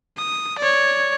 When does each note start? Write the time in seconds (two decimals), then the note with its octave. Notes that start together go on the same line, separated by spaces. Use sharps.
0.18 D#6
0.59 C#5 D5